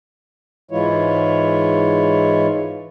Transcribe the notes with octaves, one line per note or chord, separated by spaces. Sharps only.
G#2 E3 G#3 E4 F4 C#5